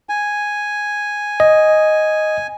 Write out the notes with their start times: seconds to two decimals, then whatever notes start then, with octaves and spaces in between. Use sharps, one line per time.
0.09 G#5
1.40 D#5